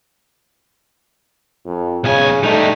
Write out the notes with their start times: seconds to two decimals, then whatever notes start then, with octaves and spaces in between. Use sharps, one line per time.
1.66 F2
2.04 B1 C#3 G#5
2.43 G3 A3 D#4